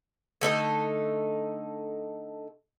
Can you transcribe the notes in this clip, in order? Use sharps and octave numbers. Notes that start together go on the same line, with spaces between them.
D3 A3 D#4 A4